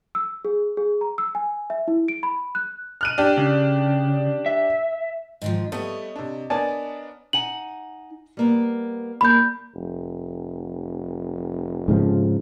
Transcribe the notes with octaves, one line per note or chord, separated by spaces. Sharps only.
E6
G#4
G#4
A#5
E6
G#5
E5
E4
D7
B5
F#6
F6 F#6 D#7
D4 G4
C#3
E5
G#2 D#3 F3
G3 A3 B3 C#5 D#5
C3 D4
B3 D4 A#4 D5 G#5 A5
D#4 F#5 G#5 F#7
G3 A#3 B3
G3 A#3 B5 G6
F1
G#2 C#3 F3